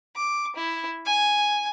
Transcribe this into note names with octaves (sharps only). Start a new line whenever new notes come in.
D6
E4
G#5